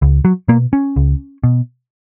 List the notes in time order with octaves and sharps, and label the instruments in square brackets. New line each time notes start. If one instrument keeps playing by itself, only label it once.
[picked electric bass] C#2
F#3
B2 A#3
C#4
C#2
B2